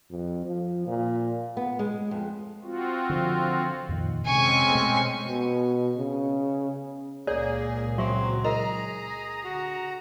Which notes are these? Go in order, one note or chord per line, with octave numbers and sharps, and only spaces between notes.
F2
F3
A#2
B3
G#3
F2
C4 F4 F#4
D3 F3
F2 A#2 D#3
C3 G#3 C4 C#4 G#5 C#6
B2 A3
B2
C#3
C#2 A#2 A#3 G#4 C#5 D5
F#3 C4 G#4 E5 C#6
E4 G#4 A#4 D#5 A#5
D3 F#4